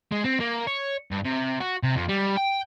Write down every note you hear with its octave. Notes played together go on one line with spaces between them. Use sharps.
G#3
C4
A#3
C#5
G2
C3
F#4
C3
F2
G3
G5